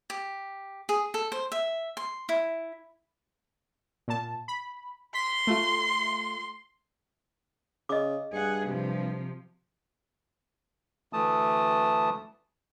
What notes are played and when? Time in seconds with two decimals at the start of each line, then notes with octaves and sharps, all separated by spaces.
0.10 G4
0.89 G#4
1.14 A4
1.32 C5
1.52 E5
1.97 C6
2.29 E4
4.08 A#2 A5
4.48 B5
5.15 C6 B6
5.47 A3 F4
7.89 C#3 D#5 D6
8.33 G2 G#4 F#5
8.66 C3 F3
11.13 D2 E3 A3 A5 D#6